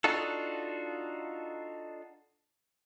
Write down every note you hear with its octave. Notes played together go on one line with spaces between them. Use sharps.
D4 D#4 F4 F#4 A4